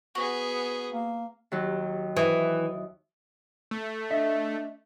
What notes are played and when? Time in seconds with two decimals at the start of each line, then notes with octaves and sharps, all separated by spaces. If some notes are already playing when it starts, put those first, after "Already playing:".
0.15 B3 F#4 G#4
0.93 A#3
1.52 D#2 F#3
2.17 E3 D#6
3.71 A3
4.11 D4 D#5 E5